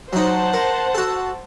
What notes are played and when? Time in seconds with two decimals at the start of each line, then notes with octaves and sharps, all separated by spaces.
0.13 F#3 D#4 C5 F#5 A5
0.54 A#4
0.95 F#4 A4